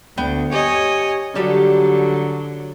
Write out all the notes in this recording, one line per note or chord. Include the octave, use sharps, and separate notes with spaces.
D2 B3 G5
G4 C#5 D#5 G#5
D3 F#3 G3 G4 A4